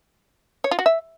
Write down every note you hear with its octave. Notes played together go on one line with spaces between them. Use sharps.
C#5
F4
F#4
E5